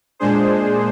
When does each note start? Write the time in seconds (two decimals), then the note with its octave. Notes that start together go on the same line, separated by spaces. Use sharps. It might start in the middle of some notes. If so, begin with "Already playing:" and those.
0.19 A#2 G#3 D4 G#4 C5